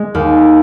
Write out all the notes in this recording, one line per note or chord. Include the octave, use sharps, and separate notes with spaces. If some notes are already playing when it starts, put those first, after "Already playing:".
Already playing: G#3
D#2